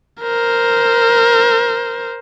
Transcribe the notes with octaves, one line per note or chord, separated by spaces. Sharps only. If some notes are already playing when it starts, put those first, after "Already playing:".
A#4 C5